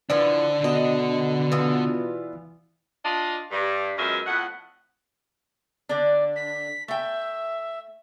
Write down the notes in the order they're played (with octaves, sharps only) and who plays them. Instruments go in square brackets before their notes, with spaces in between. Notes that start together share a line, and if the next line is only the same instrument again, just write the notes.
[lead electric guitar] D3 D4 [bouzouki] E3 F3 B4 [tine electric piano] D5
[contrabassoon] B2 [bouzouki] D#5
[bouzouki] E3 B3 F4
[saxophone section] D4 F4 D#5
G2
F#2 B2 F#3 G#3 F4 E5
F2 A2 B3 F#5
[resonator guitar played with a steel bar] D3 D4 [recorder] D5
[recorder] B6
[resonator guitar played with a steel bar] A3 G5 [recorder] E5